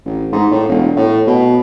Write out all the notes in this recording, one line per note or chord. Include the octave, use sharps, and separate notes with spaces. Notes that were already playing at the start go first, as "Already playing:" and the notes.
A1
G#2
A2
E1
A2
B2